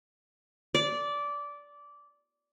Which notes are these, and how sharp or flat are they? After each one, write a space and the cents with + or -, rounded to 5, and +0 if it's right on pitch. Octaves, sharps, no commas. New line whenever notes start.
D5 -15